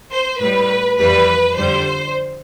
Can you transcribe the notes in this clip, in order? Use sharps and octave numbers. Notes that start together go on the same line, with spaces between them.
C5
A2 G3 B4
F2 E3 G3 B4
F2 D3 G3 C5